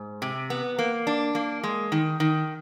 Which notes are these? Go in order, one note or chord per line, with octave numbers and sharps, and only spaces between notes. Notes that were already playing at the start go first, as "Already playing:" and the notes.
Already playing: G#2
C3
B3
A#3
D4
A#3
G#3
D#3
D#3